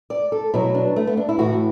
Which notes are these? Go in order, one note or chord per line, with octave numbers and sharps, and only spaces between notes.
D5
A4
B2 F#3 E4
D4
A3
B3
D4
E4
A2 E3 F#4